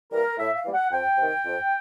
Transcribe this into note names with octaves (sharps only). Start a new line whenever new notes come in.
E3 G3 A#3 A#4
A2 E5
F5
E3 G3 A#3
F#5
F2 G5
C3 D#3
F2